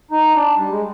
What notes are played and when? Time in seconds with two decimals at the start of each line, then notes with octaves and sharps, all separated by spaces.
0.11 D#4
0.34 D4
0.58 G3
0.69 G#3